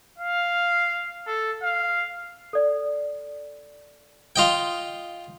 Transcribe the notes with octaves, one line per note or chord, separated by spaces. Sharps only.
F5
A4
F5
A4 D5
F4 D#5 G5